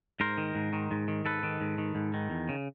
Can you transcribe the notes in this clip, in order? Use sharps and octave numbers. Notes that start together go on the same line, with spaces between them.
G#2 A#4 C5
D#3
G#2
D#3
G#2
D#3
G#2 A4 B4
D#3
G#2
D#3
G#2
D#3
E2
C#3